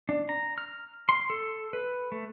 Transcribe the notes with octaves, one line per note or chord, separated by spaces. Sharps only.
D4
A#5
F6
C6
A4
B4
A3